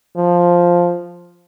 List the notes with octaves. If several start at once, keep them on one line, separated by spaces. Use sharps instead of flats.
F3